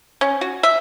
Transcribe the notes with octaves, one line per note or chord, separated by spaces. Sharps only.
C#4
F#4
E5